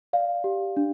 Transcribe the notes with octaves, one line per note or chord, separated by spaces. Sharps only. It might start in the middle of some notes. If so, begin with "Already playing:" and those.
D5 F5
G4
D4